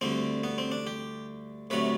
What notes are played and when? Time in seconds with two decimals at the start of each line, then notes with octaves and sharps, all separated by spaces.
0.01 D2 D3 G3 C4
0.44 B3
0.58 C4
0.71 D4
0.87 G4
1.70 D2 C3 F#3 A3 B4